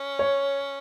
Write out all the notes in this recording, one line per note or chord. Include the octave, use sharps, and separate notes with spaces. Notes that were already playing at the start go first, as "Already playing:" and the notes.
Already playing: C#4
C#5